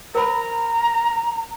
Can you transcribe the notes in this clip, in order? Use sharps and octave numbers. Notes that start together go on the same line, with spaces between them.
A#4 C5 A#5 B5